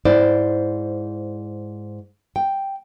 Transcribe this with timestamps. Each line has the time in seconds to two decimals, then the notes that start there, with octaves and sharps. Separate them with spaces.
0.05 G#2 E4 C5 D5
2.36 G5